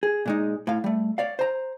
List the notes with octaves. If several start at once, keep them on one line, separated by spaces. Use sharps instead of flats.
G#4
A#2 G#3 D#4
A2 F5
G3 A3
C#5 D5 F5
C5 A#5